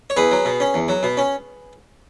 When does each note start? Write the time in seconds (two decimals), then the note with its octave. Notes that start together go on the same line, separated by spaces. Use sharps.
0.10 C#5
0.16 E2 G#4 B4
0.31 F#3
0.45 B2
0.60 C#4
0.74 E2
0.88 F#3
1.03 B2
1.17 C#4